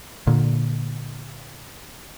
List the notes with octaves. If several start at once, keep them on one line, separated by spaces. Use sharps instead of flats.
A#2 D3